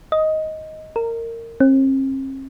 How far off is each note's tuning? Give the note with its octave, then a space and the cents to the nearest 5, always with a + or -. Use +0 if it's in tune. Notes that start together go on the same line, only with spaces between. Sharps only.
D#5 +10
A#4 -20
C4 +45